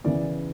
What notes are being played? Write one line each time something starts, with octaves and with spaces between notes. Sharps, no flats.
C#3 E3 B3 D5